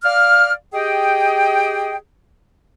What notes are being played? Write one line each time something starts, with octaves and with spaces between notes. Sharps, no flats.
D5 F5 F6
G4 G#4 D#5 G5